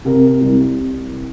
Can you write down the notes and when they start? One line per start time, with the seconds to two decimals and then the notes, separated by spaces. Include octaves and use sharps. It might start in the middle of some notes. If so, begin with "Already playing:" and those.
0.05 C3 A#4
0.41 C2